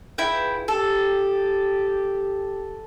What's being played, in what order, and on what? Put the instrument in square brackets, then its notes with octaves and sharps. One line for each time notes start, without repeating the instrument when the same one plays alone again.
[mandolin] E4 G5 [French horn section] F4 G#4 B4
[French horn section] G4 [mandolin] A4